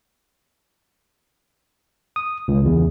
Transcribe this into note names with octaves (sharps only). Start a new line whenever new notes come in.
D#6
C#2
E2